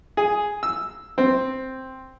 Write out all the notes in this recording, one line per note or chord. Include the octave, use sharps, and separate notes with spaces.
G#4
E6
C4